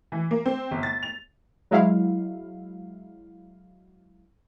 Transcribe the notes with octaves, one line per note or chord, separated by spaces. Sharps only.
E3
A#3
C4
G1
A6
F7
F#3 G#3 E4 F5